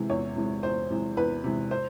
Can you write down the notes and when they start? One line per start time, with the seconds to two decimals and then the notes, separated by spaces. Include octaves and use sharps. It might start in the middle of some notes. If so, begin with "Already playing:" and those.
Already playing: C3 E3 G#3
0.09 E2 C#5
0.36 C3 E3 G#3
0.63 E2 C5
0.90 C3 E3 G#3
1.17 E2 B4
1.44 C3 E3 G#3
1.71 C5